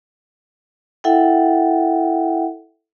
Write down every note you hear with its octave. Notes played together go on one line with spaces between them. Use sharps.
E4 A4 E5 F#5 G5